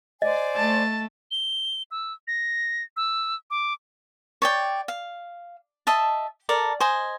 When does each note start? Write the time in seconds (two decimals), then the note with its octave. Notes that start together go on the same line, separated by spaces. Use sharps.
0.22 C5 D5 D#5 G#5
0.56 A3 A5
1.31 G7
1.91 E6
2.28 A#6
2.97 E6
3.51 D6
4.42 C#5 D5 G5
4.88 F5
5.87 D#5 E5 A5
6.49 A4 A#4 D5
6.80 C5 D#5 G#5